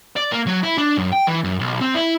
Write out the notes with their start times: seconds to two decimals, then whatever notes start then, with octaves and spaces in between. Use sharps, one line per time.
0.16 D5
0.32 A#3
0.47 F#3
0.63 E4
0.78 D4
0.97 F#2
1.12 G5
1.27 E3
1.44 F#2
1.59 B1
1.81 C4
1.95 E4